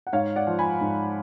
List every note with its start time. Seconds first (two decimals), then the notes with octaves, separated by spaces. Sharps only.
0.07 F#5
0.13 G#2 C#5 F5
0.36 D5 F#5
0.47 F3
0.59 G#5 B5
0.81 G#2